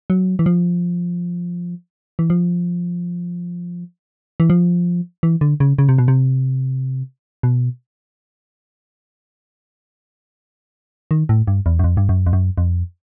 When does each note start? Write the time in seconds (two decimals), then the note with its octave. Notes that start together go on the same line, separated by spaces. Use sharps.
0.10 F#3
0.39 E3
0.46 F3
2.19 E3
2.30 F3
4.40 E3
4.50 F3
5.23 E3
5.41 D3
5.60 C#3
5.79 C#3
5.89 C3
5.98 B2
6.08 C3
7.43 B2
11.11 D#3
11.29 A2
11.47 G2
11.66 E2
11.79 F#2
11.84 F2
11.97 G2
12.09 F#2
12.26 F2
12.33 F#2
12.58 F2